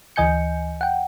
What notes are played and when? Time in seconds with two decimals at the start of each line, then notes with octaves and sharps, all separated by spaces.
0.16 D2 E3 D#5 G#5 G6 C#7
0.81 F#5 G5